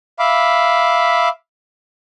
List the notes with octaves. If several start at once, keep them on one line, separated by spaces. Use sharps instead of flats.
E5 F5 B5 D6